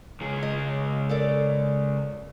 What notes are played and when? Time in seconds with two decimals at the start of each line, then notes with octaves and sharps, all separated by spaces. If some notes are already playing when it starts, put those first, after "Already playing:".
0.21 C#2 G#4
0.43 D#5
1.09 A4 A#4 D5